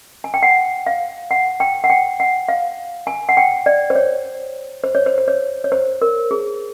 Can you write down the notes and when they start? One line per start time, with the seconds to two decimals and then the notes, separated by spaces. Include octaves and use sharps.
0.24 G#5
0.34 G5
0.43 F#5
0.87 F5
1.31 F#5
1.60 G5
1.84 F#5
1.90 G5
2.20 F#5
2.49 F5
3.07 G#5
3.29 F#5
3.37 G5
3.66 D5
3.90 C5
3.95 C#5
4.84 C5
4.95 C#5
5.06 C5
5.18 C5
5.28 C#5
5.64 C#5
5.72 C5
6.02 A#4
6.31 G#4